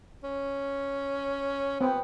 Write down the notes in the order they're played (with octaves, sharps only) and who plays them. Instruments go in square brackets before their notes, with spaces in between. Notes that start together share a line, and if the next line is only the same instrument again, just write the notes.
[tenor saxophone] C#4
[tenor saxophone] B3 [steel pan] C4